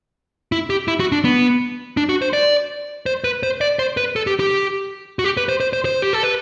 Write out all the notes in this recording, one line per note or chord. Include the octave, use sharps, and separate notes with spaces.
E4
G4
E4
F#4
D4
B3
D4
F#4
C5
D5
C5
B4
C5
D5
C5
B4
A4
G4
G4
F#4
G4
B4
C5
C5
C5
C5
G4
A4
B4